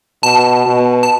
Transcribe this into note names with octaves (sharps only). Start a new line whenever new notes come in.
B2 A5
B2
A5